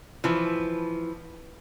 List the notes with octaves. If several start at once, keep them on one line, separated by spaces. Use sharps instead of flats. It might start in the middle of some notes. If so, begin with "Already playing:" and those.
E3 F3